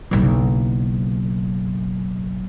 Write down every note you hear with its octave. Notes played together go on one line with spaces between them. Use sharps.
F#1 B1